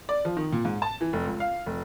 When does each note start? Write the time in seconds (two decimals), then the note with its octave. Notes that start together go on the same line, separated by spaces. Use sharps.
0.09 D5
0.25 F3
0.37 D#3
0.53 A#2
0.65 G#2
0.82 A5
1.01 E3
1.13 F1
1.26 C#2
1.40 F5
1.66 F1